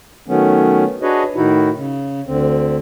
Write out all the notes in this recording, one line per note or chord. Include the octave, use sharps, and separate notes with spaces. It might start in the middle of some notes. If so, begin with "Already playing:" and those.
D#3 F#3 A3 B3 C#4
D4 F#4 G#4 B4 C#5 D#5
A2 D#3 D#4 E4 F#4
C#3
D2 D3 C4